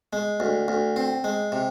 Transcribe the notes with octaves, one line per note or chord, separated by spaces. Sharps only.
G#3
D2
D2
C4
G#3
C3